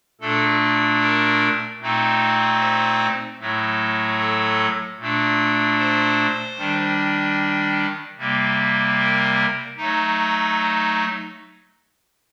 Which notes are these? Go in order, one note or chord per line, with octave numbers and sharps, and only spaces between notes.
A#2 A3 D4 A4
A#4
A#2 A3 C4 D#4
C5
A2 F#3 A3
A4
A#2 A3 D4
C5
D#3 G3 D4
C3 G3 A#3
A#4
F#3 A3 D#4